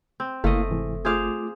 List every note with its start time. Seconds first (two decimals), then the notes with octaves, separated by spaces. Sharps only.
0.20 C4
0.44 F#1 A3 A#3 E4 D#5 F5
0.69 G#2 C3 E3
1.05 A3 F4 G#4 C5 F5 D6